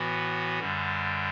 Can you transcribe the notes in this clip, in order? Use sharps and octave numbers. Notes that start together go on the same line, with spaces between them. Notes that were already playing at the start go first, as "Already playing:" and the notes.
Already playing: A2 E3 B3 F#4
F#2 D3 G3